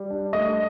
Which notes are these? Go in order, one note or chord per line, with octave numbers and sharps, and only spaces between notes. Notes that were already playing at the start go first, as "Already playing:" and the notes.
Already playing: G3
D4
A3 D#5